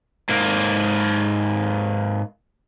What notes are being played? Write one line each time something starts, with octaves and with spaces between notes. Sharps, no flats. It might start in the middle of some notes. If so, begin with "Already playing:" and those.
G#2 A#3